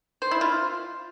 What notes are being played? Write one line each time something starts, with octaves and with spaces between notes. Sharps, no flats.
C5
E4
F4